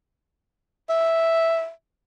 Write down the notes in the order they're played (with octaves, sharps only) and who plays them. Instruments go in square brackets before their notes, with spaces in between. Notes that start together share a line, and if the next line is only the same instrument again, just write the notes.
[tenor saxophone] E5